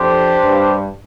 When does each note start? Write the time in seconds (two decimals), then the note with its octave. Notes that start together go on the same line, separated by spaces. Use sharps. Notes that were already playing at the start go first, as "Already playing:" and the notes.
Already playing: F2 D4 G4 C5
0.41 G2